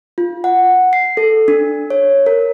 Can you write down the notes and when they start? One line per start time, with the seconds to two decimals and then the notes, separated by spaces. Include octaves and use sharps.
0.18 F4
0.44 F#5
0.93 C7
1.17 A4
1.48 D4
1.90 C#5
2.26 A#4